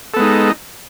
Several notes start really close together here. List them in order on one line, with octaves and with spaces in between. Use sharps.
A4 B3 G#3 D#4